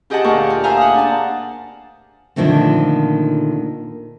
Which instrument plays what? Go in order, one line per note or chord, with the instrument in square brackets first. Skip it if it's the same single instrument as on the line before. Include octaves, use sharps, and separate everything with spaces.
[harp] F4 G4 G#4 D#5 F#5 A5
D2 A#2 A#3 A#4 C#6
F4
C5 E5 F5 G#5 A#5
F#5 D#6
D4 A5
[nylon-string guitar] A#2 D3 D#3 F3 A3 C4